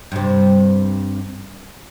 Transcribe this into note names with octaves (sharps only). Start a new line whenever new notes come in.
G2 C3